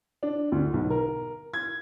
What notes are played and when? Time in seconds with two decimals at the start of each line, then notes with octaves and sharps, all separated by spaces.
0.23 D4
0.52 D2
0.74 B1
0.90 A#4
1.54 G#6